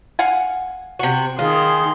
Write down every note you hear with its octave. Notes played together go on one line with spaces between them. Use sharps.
F5 F#5 G#5
C3 F#4
D#3 F4 G#4 C6